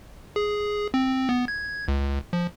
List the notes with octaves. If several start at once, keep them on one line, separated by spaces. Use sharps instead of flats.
G#4
C4
B3
G#6
C#2
F3